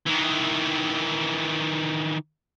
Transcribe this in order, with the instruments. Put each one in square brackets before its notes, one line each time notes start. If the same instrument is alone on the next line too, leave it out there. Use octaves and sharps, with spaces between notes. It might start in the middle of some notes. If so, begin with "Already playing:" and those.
[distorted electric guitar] D#3 E3